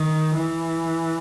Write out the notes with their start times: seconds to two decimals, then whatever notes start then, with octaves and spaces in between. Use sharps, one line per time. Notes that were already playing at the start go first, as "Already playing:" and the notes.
Already playing: D#3
0.34 E3